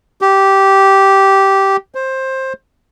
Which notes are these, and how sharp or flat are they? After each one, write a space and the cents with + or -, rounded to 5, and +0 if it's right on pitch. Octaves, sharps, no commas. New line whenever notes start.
G4 -10
C5 +15